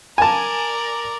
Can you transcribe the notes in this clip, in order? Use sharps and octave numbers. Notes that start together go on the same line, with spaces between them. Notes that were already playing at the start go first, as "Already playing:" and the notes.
A#4 D5 G#5 A5